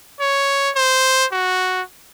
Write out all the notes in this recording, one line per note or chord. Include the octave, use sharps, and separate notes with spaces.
C#5
C5
F#4